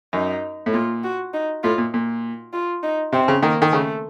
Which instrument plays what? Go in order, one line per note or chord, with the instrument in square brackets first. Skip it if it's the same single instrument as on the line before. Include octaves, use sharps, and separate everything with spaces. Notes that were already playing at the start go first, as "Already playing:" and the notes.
[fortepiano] F#2 [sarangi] D#4
[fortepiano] A2
[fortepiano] A#2 [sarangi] F4
[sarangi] F#4
D#4
[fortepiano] A2 [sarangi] F4
[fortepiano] A#2
A#2
[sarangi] F4
D#4
[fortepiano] C3 [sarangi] C4
[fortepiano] C#3
[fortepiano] D#3 [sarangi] A#3
[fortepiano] D#3
[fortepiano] C#3 [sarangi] A3